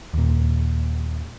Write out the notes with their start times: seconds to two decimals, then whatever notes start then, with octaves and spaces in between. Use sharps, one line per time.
0.14 D#2 A#2